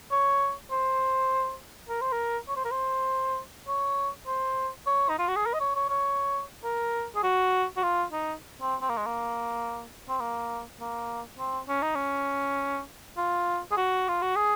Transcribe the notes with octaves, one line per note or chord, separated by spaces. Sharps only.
C#5
C5
A#4
C5
A#4
C#5
C5
A#4
C5
C#5
C5
C#5
D#4
F4
F#4
G#4
A#4
D#5
C#5
C#5
C#5
A#4
G#4
F#4
F#4
F4
D#4
C4
C4
A#3
G#3
A#3
C4
A#3
A#3
C4
C#4
D#4
C#4
F4
G#4
F#4
F4
F#4
G#4